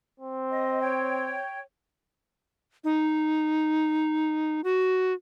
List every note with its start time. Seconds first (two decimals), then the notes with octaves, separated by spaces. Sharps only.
0.20 C4
0.51 D#5
0.79 C#5 G5
2.84 D#4
4.64 F#4